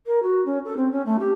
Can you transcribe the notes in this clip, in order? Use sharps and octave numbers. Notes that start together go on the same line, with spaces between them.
A#4
F#4
C#4
A4
C4
C#4
A3
G4